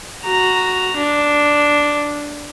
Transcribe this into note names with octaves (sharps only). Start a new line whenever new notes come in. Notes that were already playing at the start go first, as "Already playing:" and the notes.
F#4 A#5
D4